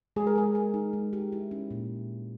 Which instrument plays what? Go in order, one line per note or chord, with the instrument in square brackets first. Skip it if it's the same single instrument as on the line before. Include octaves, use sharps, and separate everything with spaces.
[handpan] G#3 [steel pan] G#4
[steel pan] A#4
[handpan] G#3 [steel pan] G#4
[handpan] A#4
D#4
G#3
G4
E4
C#4
A#2